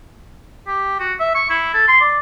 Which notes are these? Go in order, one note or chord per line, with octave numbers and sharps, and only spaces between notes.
G4
F#4
E5
C#6
E4
A4
C6
D5